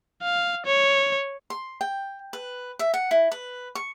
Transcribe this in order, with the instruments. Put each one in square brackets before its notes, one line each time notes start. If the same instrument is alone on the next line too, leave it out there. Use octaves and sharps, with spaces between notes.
[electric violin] F5
C#5
[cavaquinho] C6
G5
B4
E5
F#5
E4
B4
C#6